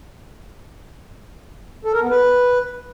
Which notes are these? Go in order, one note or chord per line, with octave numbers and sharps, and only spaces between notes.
A4
A#4
B3
B4